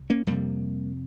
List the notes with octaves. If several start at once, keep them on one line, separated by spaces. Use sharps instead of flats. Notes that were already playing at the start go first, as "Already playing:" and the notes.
Already playing: C2
A#3 C#4
F2 C3 G3 A#3